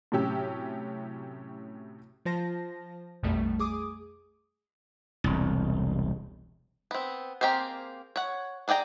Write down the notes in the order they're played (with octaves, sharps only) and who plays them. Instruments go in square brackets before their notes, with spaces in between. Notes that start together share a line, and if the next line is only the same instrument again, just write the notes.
[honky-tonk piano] A2 C3 F#3 C#4 G4 E6
[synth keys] F3 F4 C5 A5 A#6
A#1 F2 B2 D#3 G3 A3
G#4 D6 D#6
[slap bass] E1 C2
[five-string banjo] B3 C4
A#3 C4 G4 G#4 C5
C#5 F#5
D4 G#4 D5 G5 A#5